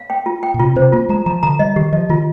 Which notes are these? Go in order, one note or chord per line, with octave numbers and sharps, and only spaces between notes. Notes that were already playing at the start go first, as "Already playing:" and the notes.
Already playing: F5
G5
F4
G5
A#2
C3 F4
C3 C5
A#3 F4
G#3 A#5
F3 A#5
D3 A#5
G3 D#5
D#3 G4
F3 D#5
D#3 F4